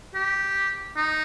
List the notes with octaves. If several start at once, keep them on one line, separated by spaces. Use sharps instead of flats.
G4
D#4